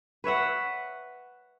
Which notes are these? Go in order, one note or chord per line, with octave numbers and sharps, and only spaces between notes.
B4 C#5 E5 F#5